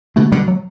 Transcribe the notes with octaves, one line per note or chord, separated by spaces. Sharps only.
B2 D3 A3
B2 D3 G3
F#3